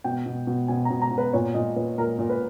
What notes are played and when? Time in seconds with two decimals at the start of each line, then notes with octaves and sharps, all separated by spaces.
0.04 B2 G5
0.26 B2
0.47 B2
0.68 B2 G#5
0.85 A#5
0.90 B2
1.02 A#5
1.12 B2
1.18 B4
1.33 A#2 C#5
1.54 A#2 D#5
1.76 A#2 B4
1.98 A#2 A#4
2.19 A#2
2.30 B4